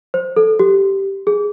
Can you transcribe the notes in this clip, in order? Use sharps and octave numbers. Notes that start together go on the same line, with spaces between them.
C5
A4
G4
G#4